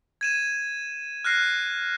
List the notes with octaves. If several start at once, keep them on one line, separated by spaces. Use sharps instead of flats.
G#6 D#7 E7
F6 F#6 A#6 C7